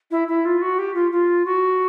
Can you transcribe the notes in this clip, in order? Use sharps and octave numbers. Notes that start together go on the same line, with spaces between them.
E4
E4
F4
F#4
G4
F4
F4
F#4